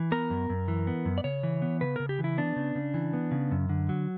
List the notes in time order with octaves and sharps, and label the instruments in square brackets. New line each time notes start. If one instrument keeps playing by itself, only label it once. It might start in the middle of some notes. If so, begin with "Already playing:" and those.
Already playing: [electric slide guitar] E3
B3 A#4
F#2
F#2
E3
B3
F#2
D5
C#3 C#5
E3
B3
C#3 B4
C#3 A#4
G4
E3
E4
B3 D4
C#3
C#3
E3
B3
C#3
F#2
D3
F#3